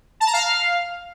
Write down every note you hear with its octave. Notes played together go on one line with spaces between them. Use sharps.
A5
A#5
F5